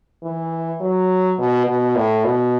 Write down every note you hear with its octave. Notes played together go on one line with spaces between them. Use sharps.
E3
F#3
B2
B2
A2
B2